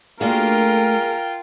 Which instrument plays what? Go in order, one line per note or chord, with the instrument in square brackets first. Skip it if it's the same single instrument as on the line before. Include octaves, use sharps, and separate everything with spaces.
[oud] A3 D4 F#4 [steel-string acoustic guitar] A#3 G#4 [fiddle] F4 G5 [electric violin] A#4